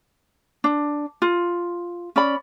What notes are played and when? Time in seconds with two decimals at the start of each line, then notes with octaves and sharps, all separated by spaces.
0.64 D4
1.22 F4
2.16 C#4 D5 B5